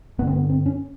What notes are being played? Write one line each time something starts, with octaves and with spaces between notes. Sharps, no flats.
G2 D3 B3
C4
B3
C4
C#4